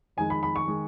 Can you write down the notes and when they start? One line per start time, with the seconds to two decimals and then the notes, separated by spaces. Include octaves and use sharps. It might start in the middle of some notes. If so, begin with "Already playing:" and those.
0.17 F2 D#3 G#3 D#4 G#5
0.30 B5
0.43 B5
0.56 C#6
0.68 D#3 G#3